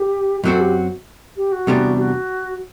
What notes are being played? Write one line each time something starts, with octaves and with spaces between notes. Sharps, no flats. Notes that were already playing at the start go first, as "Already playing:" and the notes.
Already playing: G4
F#2 F#3 C4 F#4 A4
G4
G4
F#4
E2 C3 G3 B3 D4
F#4